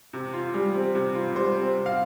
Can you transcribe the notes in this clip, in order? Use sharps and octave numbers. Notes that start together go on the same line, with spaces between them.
C3
F4
G3
C4
C3
F4
G3 C5
C4
C3
F5